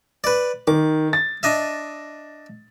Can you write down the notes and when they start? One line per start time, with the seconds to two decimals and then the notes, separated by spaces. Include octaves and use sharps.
0.24 B4 D5
0.67 D#3 D6
1.13 A6
1.43 D4 D#5 E5